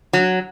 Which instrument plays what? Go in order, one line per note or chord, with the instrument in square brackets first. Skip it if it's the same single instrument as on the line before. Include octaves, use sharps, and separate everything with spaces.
[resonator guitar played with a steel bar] F#3